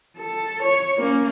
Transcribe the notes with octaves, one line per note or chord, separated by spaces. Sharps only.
A4
C#5
A#3 C#4